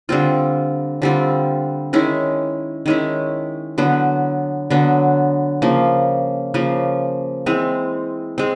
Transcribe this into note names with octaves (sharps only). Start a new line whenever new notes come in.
D3 G3 C4 F4
D3 G3 C4 F4
D#3 G#3 C#4 E4
D#3 G#3 C#4 E4
D3 F#3 B3
D3 F#3 B3
C#3 F3 A#3
C#3 F3 A#3
E3 G#3 C4
G#3 C4